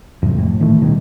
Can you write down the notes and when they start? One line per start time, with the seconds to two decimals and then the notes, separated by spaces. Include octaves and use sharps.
0.22 E2 G#2 C3 F#3
0.35 F2 A2
0.60 A2 D#3 E3 A3
0.81 D#1 B2 D#3 G3